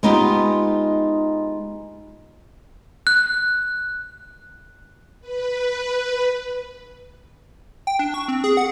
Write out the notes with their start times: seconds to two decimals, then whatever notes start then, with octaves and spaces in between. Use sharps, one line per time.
0.03 G#3 B3 D#4 F4 G4
3.07 F#6
5.21 B4
7.87 G5
7.99 D4
8.14 C#6
8.28 C4
8.44 G#4
8.57 F#5